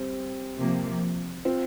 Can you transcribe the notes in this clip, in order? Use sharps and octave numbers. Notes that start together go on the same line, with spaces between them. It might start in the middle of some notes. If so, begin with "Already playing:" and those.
Already playing: G3 C4
C3 F3 A#3
C4 F4